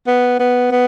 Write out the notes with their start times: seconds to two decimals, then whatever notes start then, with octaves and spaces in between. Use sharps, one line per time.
0.07 B3
0.40 B3
0.72 B3